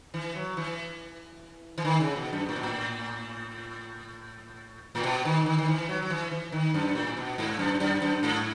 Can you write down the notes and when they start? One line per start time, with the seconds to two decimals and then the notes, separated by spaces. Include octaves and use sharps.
0.14 E3
0.35 F#3
0.57 E3
1.78 E3
1.85 D#3
2.00 C#3
2.16 B2
2.33 F#2
2.49 A2
2.56 B2
2.63 A2
4.95 A2
5.03 B2
5.25 D#3
5.46 D#3
5.58 D#3
5.68 E3
5.89 F#3
6.02 F#3
6.10 E3
6.31 E3
6.52 D#3
6.74 F#2
6.95 A2
7.17 B2
7.38 G#2
7.59 F#2
7.80 F#2
8.02 F#2
8.23 G#2